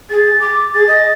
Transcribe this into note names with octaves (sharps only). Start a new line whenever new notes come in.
G#4 A6
D6
G#4 A6
D#5